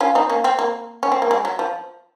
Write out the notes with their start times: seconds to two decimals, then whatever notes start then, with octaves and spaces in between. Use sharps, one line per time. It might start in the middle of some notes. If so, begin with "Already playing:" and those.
0.01 C#4 F4
0.15 C4 D#4
0.30 A#3 C#4
0.44 C4
0.59 A#3
1.03 C#4
1.12 C4
1.22 A#3
1.31 G#3
1.45 F#3
1.59 F3